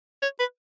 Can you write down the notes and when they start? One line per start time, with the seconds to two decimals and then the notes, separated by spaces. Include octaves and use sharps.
0.22 C#5
0.40 B4